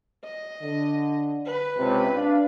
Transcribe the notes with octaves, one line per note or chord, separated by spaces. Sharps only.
D#5
D3
B4
C#2 C3
D4 F5